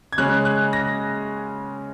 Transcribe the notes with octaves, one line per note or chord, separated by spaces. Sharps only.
G#6
C#3 G#3 C#4 F#6
F#6
A#6